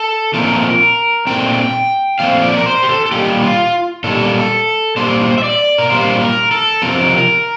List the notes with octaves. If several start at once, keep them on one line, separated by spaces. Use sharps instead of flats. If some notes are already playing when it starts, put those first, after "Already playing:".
Already playing: A4
A#2 F3 A3 C4 A#4
A#2 F3 A3 C4 G5
A#2 F3 A3 C4 F5
D5
A#4
C5
G4
A4
A4
A#2 G3 A#3 G4
F4
A#2 G3 A#3 A4
A#2 G3 A#3 C5
E5
D5
A#4
A#2 G3 A#3 C5
A#4
A4
F2 C3 F3 C4 A#4